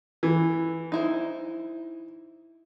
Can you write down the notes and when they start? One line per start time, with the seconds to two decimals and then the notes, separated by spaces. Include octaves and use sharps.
0.23 E3
0.92 D#4 E4 C5